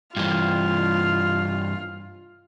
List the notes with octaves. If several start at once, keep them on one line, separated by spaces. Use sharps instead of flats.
G2 E3 F4